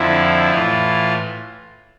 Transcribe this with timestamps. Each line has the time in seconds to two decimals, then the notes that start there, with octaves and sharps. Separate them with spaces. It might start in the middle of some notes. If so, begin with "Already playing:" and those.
Already playing: F2 D3 F3 E4
0.51 A2 E3 F4